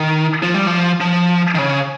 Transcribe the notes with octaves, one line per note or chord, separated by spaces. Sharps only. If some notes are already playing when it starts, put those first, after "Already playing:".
Already playing: D#3
F3
G3
F3
F3
D#3
C#3